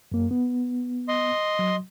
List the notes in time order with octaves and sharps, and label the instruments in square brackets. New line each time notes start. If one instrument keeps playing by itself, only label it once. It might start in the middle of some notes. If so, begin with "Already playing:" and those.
[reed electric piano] F#2 A#3
B3
[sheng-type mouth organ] D#5 C6
[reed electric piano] F#3